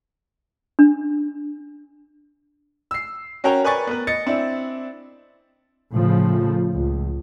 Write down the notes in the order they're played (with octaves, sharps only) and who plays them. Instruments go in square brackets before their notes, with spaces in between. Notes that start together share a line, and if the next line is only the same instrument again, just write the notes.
[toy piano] D4
[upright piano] E6 C7
C#4 F#4 A#4 C#5 G5 A#5
A#4 B4 D5 G#5 C#6 A6
B3 A#4 B4
D#5 A6 C#7
C4 D4 E4
[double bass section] A2 C#3 F3
C#2